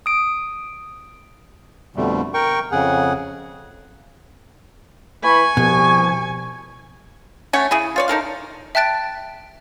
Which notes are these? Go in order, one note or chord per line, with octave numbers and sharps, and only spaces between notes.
D#6 D7
F2 B2 D3 G3 A3
A#4 G5 C#6
F2 C#3 G#4 F#5
E3 G#5 B5 C#6
C2 B2 F3
A3 C#4 C#5 F#5
C#3 E4 G#4
F4 C#5 D5
D#4 A4 A#4 F5
E5 G5 A5 F#6 A6 D7